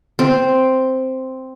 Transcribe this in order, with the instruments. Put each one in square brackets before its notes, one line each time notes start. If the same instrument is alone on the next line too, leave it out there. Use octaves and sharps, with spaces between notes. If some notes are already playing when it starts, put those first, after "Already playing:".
[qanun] C4